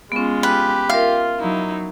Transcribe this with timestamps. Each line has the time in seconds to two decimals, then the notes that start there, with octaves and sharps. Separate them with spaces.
0.12 G#3 B3 C#4 F4
0.43 G4 B4
0.89 F4 A#4 E5 F5
1.40 F#3 D#4 E4